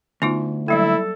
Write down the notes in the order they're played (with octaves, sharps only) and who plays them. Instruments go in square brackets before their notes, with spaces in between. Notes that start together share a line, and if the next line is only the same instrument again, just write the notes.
[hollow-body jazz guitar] D2 [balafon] B3 D#4 F4
[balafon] F#3 G3 A#3 [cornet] E4 [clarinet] A4